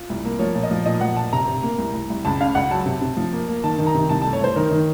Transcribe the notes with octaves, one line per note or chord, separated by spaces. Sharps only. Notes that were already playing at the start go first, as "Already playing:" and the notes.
Already playing: F4
C2
A#3
F3 C#5
A#2
D#5
F3
A#2 D#5
F3 F#5
A#2 A5
C3 A#5
C3
A#3
C2
C2
C2
C#2 A5
C#3 F5
C#2 F#5
F#3 A5
C3
C3
F3
A#3
A#3
D#3 A5
D#3
A#5
C3
C2 A5
A3 A5
C#5
C2 C5
D#3 A#4
D#3